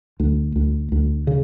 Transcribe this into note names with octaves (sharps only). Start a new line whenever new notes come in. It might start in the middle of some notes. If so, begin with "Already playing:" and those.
D2
D2
D2
C#3